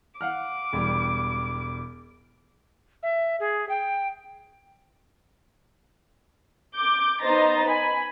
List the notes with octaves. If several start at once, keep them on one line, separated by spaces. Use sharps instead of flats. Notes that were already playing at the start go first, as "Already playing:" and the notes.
F5 F#5 D6 F6
E1 G3
E5
G#4
G5
D6 G6
B3 D#4 C5 A#5 A6
G#5 B5